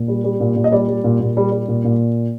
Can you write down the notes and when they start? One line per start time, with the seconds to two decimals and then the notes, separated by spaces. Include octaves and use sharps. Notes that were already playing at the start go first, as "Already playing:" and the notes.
Already playing: A#2
0.08 G3
0.24 G3
0.40 A#2
0.56 A#2
0.64 D#5
0.72 G3 D5
0.88 G3
1.04 A#2
1.20 A#2
1.37 G3
1.52 G3
1.68 A#2
1.84 A#2